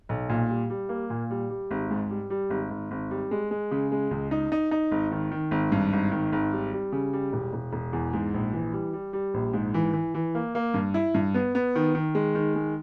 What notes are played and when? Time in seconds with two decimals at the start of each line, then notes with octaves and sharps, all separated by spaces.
0.09 B1
0.29 A#2
0.49 G3
0.70 G3
0.89 A#3
1.10 A#2
1.30 G3
1.50 G3
1.71 G#1
1.91 G#2
2.10 G3
2.30 G3
2.50 G#1
2.70 G#1
2.91 G#1
3.11 G3
3.31 G#3
3.51 G#3
3.71 C#3
3.92 G#3
4.11 C#2
4.31 D#4
4.52 D#4
4.71 D#4
4.91 G#1
5.11 D#3
5.31 D#3
5.51 G#1
5.72 G2
5.93 G#1
6.12 D#3
6.32 G#1
6.52 G3
6.73 G3
6.92 C#3
7.13 G3
7.33 E1
7.53 E1
7.73 E1
7.93 E2
8.13 G#2
8.34 A#1
8.53 E3
8.73 G3
8.93 G3
9.13 G3
9.34 A#1
9.54 G#2
9.74 E3
9.93 E3
10.14 E3
10.35 A#3
10.55 A#3
10.74 G2
10.94 E4
11.14 G2
11.34 B3
11.55 B3
11.75 D#3
11.95 D#3
12.15 G#3
12.35 D#3
12.56 G#3